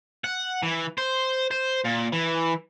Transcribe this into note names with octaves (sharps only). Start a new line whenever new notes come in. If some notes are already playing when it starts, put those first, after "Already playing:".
F#5
E3
C5
C5
A#2
E3